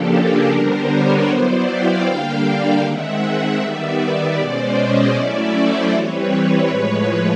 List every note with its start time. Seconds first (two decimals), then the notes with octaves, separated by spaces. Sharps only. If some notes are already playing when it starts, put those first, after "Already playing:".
Already playing: C#3 F3 A#3 D4 G4 A4
0.12 G#4 A#4
0.50 D3 G3 B3 D4 A#4 C5
0.89 B4 C#5
1.28 F#3 B3 E4 C5 D5
1.66 F5 G5
2.06 D3 G3 A#3 D4
2.82 D#3 G#3 C4 E5 F#5
3.21 E5 F#5
3.59 D#3 G3 B3 D5 E5
4.37 B2 G#3 C#4 C5 D5
4.75 C#5 D#5
5.14 F#3 A3 C#4 E4 D5 E5
5.53 C5 D5
5.92 E3 G3 C4 B4 C#5
6.30 B4 C#5
6.69 A2 F3 G#3